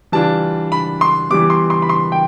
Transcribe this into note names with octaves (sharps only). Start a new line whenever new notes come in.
E3 G3 D4 F4 A5
B5
C6
E3 G3 B3 D6
C6
C6
B5
C6
G5